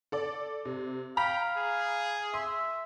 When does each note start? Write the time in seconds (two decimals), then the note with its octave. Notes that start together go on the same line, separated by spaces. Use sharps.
0.12 A4 D5
0.65 C3
1.17 F5 G5 A#5 B5 B6
1.57 G#4
2.34 E5 C6